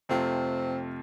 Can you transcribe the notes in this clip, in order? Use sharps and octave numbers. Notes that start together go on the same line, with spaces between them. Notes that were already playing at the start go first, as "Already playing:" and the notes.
F2 C3 A3 C4 F4